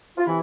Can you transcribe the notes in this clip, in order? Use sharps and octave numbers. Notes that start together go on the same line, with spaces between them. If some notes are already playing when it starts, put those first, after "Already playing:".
F4
C3 E3 E4